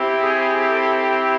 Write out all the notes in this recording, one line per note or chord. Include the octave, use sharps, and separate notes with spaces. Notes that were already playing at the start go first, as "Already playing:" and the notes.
Already playing: C4 E4 G4
G#4
A4